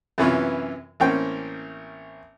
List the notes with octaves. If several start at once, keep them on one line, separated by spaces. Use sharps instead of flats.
F#2 C3 E3 B3 C#4 F4
A1 A#3 C4 C#4 G5